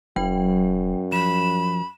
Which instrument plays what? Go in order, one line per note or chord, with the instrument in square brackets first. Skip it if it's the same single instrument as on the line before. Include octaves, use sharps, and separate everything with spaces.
[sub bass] E1 [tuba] F#2 [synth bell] F#3 G5
[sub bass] F3 [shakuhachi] B5 [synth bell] E7